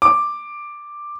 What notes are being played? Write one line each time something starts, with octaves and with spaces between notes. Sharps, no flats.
D6